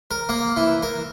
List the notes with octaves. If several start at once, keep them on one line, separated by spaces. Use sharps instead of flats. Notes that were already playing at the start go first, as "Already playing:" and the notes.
A#4
A#3
E3
A#4